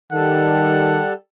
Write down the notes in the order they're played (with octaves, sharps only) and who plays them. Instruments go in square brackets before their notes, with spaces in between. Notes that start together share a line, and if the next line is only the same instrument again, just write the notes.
[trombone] D#3 [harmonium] G3 A4 [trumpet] F#5